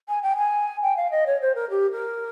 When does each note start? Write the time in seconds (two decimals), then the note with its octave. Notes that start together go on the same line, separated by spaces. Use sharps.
0.08 G#5
0.23 G5
0.37 G#5
0.82 G5
0.97 F5
1.11 D#5
1.26 C#5
1.41 C5
1.55 A#4
1.70 G4
1.92 A#4